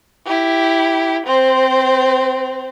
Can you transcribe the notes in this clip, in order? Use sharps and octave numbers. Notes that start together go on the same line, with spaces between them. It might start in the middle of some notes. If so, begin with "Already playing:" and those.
E4 G4
C4 C5